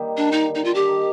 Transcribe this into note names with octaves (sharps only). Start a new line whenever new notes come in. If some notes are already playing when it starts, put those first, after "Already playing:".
Already playing: D#3 G3 A#3
D4
D#4
D3
D#4
F4
D#3 G4
D#3